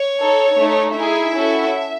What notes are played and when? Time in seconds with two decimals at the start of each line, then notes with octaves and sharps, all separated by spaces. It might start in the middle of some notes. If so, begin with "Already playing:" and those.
Already playing: C#5
0.19 D#4 A4
0.57 A3 D#4 A4
0.95 D#4 E4 G#4 E5
1.34 C#4 F#4 A4